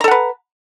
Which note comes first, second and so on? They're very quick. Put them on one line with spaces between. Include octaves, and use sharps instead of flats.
A#5 A4 F#5 B4